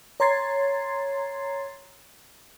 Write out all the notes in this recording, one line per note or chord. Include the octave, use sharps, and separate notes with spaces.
C#5 A#5 C6 G#6 A6 C7